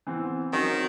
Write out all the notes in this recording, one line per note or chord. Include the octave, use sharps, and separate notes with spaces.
E3 B3 C4
D#3 F#3 C4 C#4